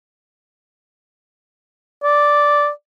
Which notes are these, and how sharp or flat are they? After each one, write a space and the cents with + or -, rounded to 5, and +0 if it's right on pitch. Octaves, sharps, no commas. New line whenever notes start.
D5 -5